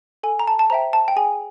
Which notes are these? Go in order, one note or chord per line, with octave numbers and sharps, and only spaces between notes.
A4 G#5
A#5
A5
A5
C5 E5 G5 A#5
A5
G5
G#4 G#5